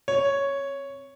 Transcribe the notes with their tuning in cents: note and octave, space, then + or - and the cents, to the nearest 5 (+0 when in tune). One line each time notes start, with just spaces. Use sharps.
C4 +0 C#5 +0